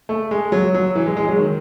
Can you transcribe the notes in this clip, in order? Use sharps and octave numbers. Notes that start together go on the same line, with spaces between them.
A3
G#3
F#3
F#3
E3
G#3
G#3
F#3
D#3